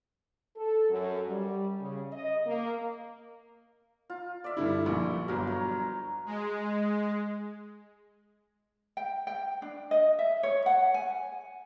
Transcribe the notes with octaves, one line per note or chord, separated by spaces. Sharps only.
A4
F#2
G3
C#3
D#5
A#3
F4
D5 E5
G2 D3 E4
A#1 A#2 C#6
G1 F#3 A#4
C#5 A#5
G#3
G5
G5
D4
D#5
E5
C#5
F#5
G#5